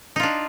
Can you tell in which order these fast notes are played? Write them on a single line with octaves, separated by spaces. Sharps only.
D#4 F4 D4